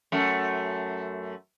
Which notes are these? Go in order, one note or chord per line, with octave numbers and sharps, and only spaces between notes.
F#2 A3